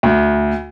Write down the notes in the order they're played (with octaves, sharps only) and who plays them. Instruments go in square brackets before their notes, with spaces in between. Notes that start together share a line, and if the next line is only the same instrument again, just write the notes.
[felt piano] D2